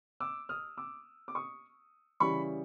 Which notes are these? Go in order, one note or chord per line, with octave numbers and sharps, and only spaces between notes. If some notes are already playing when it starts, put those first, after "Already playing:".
D6 E6
D#6 F6
D6 E6
D6
C#6 D#6
C#3 E3 G3 B5 C#6